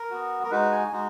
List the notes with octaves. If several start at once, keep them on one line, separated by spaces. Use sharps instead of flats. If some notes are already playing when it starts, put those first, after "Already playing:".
Already playing: A#4
B3 F#4
A#4
G#3 D#4 F#4 B4
G#5
G#3 D#4 F#4